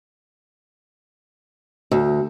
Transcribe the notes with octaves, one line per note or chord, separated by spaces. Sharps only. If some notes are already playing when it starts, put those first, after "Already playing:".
D2